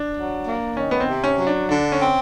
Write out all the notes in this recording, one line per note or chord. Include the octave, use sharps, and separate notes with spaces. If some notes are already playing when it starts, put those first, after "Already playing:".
Already playing: D4
F#3
A#3
D#3 C#4
B3
C4
C3
C#4
F#3
D4
D3 D4
C#4
C4